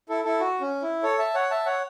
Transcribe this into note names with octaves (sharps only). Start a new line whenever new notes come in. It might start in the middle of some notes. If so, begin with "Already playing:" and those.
E4 A4
E4 A4
F#4
C#4
E4
A4 C#5
E5 A5
C#5 F#5
E5 A5
C#5 F#5